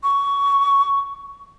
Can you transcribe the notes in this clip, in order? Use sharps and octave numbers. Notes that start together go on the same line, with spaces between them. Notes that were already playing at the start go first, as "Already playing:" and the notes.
C#6